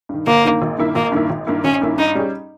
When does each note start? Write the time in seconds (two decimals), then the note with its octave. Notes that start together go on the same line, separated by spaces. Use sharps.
0.09 G2 D#3
0.27 G1 A#3
0.44 G2 D#3
0.62 G#1
0.78 G2 D#3 A#3 E4
0.95 G#1 A#3
1.12 G2 D#3 A#3 E4
1.30 G#1
1.47 G2 D#3 A#3 E4
1.64 G#1 C#4
1.81 G2 D#3 A#3 E4
1.98 G2 D#4
2.15 G3 C#4 G#4